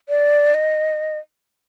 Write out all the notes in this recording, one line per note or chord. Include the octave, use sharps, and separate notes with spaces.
D5
D#5